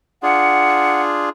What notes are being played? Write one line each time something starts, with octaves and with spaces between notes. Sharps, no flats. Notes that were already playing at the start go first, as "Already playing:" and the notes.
D4 F4 G#4 F#5